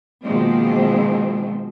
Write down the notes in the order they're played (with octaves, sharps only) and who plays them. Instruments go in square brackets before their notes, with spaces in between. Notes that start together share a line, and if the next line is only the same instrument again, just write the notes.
[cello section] B2 D#3 F3 G#3 A#3 C4